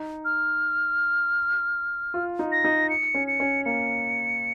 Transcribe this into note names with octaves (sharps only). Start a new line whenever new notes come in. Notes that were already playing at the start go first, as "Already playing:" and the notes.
Already playing: D#4
F6
F4
D#4
A#6
D#4
C#7
C#4
C#7
C#4
A#3 C#7